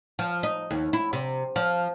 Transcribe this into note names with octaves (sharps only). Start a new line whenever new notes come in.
F3
D#4
D#2
E4
C3
F3